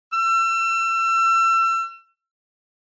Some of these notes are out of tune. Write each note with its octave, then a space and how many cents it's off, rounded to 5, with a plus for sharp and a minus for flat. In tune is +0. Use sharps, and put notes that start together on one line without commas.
E6 +35